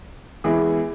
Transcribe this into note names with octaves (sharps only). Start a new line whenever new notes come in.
E2 E3 G#3 E4 G#4